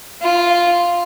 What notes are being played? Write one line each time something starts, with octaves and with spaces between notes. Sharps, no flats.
F4